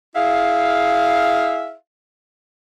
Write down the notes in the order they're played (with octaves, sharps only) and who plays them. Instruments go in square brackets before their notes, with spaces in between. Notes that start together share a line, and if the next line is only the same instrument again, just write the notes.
[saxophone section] E4 G#4 E5 F5